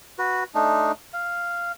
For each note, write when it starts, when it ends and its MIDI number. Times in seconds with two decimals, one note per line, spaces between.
0.19 0.44 66
0.19 0.44 71
0.55 0.92 57
0.55 0.92 62
0.55 0.92 63
1.14 1.72 77